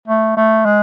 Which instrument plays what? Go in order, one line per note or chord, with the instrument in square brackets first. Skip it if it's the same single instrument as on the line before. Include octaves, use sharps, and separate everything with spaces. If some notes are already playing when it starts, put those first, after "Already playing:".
[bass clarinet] A3
A3
G#3